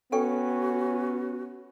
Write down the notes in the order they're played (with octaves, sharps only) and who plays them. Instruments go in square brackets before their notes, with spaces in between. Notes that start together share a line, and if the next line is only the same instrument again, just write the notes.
[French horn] B3 [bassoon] C#4 [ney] F#4 [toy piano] A4 G5 C#6